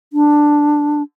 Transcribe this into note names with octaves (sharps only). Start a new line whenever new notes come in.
D4